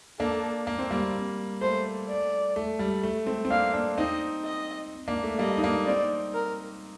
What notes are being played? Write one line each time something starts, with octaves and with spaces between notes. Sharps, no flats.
A#3 D4 A4
A#3
C4
G3 A#3
A3 C5
D5
A3
G3
A3
A3 C4
C4
A#3 D4 F5
A#3 D4
C4 D#4 D#5
D#5
A#3 D4
A3
G3 A#3 D#5
D#4
A#3 D4
C4 D#4 D5
A#4